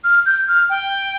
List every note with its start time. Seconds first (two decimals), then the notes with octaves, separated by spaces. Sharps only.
0.04 F6
0.26 G6
0.48 F6
0.70 G5